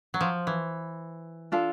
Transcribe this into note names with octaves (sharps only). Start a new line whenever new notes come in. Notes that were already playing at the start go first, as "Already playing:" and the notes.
F#3
F3
E3
D4 F4 A4